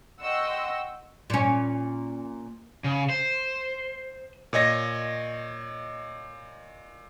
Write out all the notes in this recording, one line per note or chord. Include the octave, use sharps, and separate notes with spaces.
D#5 F#5 G5 C6 C#6 E6
A#2 C#4
C#3
C5
A#2 C#5 D#5 A#6